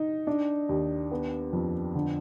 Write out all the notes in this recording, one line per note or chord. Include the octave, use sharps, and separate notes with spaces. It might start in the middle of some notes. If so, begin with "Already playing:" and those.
Already playing: D#4
D4
D#2
B3
F2
D3